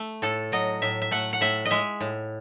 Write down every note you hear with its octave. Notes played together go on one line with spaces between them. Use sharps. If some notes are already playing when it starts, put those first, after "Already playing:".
Already playing: A3
A2 A4
F#3 D#5
A2 E5
E5
A3 F#5
F#5
A2 E5
D#5
G#3 E5
A2